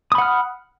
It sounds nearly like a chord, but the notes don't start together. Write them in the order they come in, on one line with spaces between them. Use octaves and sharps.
D#6 B5 F#5 F6